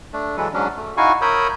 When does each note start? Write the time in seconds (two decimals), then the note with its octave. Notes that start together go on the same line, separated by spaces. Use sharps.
0.13 A3 D4
0.37 E3 F#3 G#3 A4 B4
0.54 G#2 F#3 C#4 D4
0.77 A3
0.97 D#4 E4 F#4 F5 G#5 C#6
1.22 A#4 C#5 B5 D#6 E6 G6